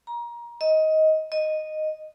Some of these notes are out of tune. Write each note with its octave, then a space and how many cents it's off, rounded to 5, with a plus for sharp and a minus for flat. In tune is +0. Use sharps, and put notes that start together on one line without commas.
A#5 +25
D#5 +15
D#5 -5